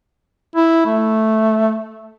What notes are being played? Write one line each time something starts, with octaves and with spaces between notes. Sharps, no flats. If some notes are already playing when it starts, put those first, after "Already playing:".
E4
A3